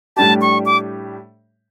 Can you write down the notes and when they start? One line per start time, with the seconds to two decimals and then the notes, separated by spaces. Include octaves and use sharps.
0.17 A2 G3 D4 G4 A5
0.41 C#6
0.66 D6